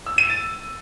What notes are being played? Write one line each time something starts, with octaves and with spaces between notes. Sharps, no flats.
E6
D#7
A6